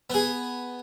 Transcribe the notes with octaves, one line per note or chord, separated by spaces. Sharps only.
B3 G#4